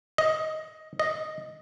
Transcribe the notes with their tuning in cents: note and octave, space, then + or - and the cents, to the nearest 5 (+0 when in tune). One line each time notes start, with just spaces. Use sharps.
D#5 +10
D#5 +0